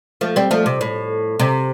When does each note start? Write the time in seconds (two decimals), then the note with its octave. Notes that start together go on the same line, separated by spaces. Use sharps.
0.21 F3 A3
0.36 G3 C4
0.51 F3 A3
0.66 C3
0.81 A2
1.39 C3